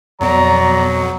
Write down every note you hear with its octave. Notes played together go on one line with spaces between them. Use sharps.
F2 B2 F#3 D5 A#5